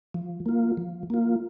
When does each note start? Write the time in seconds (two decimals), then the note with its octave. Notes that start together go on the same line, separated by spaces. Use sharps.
0.14 F3
0.46 A#3 F4
0.77 F3
1.10 A#3 F4